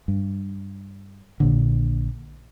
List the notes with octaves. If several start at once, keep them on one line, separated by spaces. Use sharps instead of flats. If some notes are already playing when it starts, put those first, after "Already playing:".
G2
A#1 A#2 D3